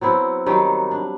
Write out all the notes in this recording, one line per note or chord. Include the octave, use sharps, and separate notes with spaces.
F#3 B3 C4 E4
D#3 F#3 G3 G4
D4